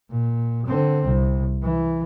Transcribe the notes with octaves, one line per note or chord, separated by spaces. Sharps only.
A#2
D3 C4
C2
E3